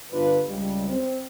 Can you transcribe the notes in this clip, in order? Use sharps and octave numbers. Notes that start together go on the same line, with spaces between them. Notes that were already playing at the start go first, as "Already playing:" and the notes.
G1 D4 F4 B4
C#2 G3
C4